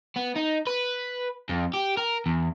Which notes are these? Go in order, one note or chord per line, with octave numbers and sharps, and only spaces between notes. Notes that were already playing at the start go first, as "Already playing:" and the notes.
B3
D#4
B4
F2
G4
A#4
E2